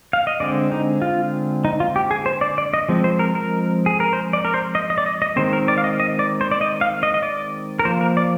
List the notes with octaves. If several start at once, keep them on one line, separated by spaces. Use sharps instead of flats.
F5
D#5
D3 G#3 C4 D5
D#4
F4
D#4
F4
G4
G#4
C5
D5
D5
D#5
F3 G#3 C4
C5
A#4
A#4
G#4
A#4
C5
D5
A#4
C5
D#5
D#5
D5
D#5
D#5
D#3 G#3 C4 C5
A#4
D5
F5
D#5
D#5
D5
C5
D5
D#5
F5
D#5
D#5
D5
A#4
F3 A#3 C5
A#4
D5